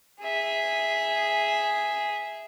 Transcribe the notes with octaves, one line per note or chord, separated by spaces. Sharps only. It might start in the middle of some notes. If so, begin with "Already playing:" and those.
G#4 E5